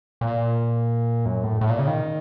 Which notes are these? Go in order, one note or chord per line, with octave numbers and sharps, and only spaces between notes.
A#2
F#2
A2
A2
A#2
C#3
D#3